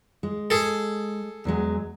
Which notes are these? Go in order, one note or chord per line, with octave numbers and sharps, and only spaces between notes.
G#3
G#4 A4
E2 F#3 G#3